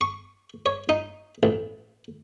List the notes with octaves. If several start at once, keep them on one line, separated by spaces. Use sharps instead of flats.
C#6
C#5
D#4
A1